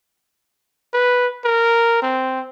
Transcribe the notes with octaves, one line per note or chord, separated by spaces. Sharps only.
B4
A#4
C4